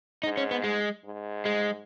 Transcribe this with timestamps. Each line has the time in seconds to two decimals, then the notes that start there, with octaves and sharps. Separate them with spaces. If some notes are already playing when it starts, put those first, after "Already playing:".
0.23 G#2 D#4
0.37 C#4
0.51 B3
0.64 G#3
1.05 G#2
1.45 G#3